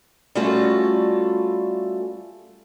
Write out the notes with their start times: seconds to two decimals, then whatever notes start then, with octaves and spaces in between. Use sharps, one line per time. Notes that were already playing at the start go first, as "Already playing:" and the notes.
0.35 G3 A3 C#4 F4 F#4 A4